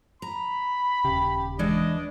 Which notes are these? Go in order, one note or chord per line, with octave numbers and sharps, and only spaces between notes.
A#5 B5
D#1 C#3 G4
E3 G#3 D4 D#5